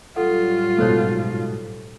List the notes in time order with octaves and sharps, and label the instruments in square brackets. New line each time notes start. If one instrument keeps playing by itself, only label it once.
[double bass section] A2 F#3 G3 [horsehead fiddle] F4 [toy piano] A4 F#5
[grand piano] G#2 B2 [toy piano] A4 C5 C#5